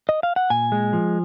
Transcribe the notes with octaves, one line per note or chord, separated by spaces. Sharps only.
D#5
F5
F#5
A#2 G#5
G#3
F3